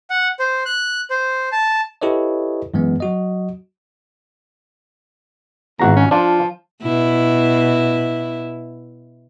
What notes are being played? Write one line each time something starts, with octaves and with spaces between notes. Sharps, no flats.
F#5
C5
F#6
C5
A5
E4 G4 A4 B4 C#5 D#5
F#2 E3 G#3 B3
F#3 F#4 D#5
G#1 E2 F#4 A#5
C#4
F3 D4 F4
B2 E4